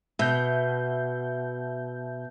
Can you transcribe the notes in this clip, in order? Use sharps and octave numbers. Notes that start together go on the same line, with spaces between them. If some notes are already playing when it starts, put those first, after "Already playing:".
B2 E5 G6